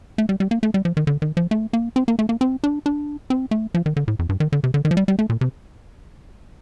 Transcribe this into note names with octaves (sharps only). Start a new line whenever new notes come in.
A3
G3
G3
A#3
A3
G3
F3
D#3
D3
D#3
F3
A3
A#3
C4
A#3
A3
A#3
C4
D4
D4
C4
A3
F3
D#3
D3
A2
F2
G2
D#3
D3
C3
D3
D#3
F3
G3
G3
A3
A#2
C3